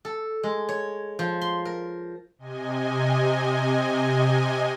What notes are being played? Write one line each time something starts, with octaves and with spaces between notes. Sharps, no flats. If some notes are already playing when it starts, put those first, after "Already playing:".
A4
G#3
C#5
F3
C6
A#4
C3 D#5 G#5